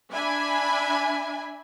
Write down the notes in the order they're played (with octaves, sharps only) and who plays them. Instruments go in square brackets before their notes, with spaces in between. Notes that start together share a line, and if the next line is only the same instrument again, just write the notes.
[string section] D4 E5 G#5 B5